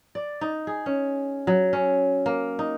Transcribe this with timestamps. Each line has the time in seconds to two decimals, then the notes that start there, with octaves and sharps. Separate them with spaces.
0.15 D5
0.41 D#4
0.67 G#4
0.86 C#4
1.47 F#3
1.73 C#4
2.26 A#3
2.59 D#4